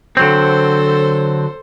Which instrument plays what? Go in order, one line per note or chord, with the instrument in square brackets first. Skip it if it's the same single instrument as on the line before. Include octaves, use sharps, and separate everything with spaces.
[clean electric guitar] D3 F#3 C4 [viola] A4 C5